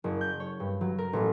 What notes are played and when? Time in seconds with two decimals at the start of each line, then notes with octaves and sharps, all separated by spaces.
0.04 F#1
0.21 G6
0.40 C#5
0.60 G2
0.81 F#3
0.98 A#4
1.13 A1